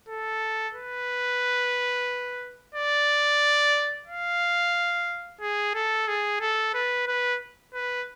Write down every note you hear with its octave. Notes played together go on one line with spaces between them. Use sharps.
A4
B4
D5
F5
G#4
A4
G#4
A4
B4
B4
B4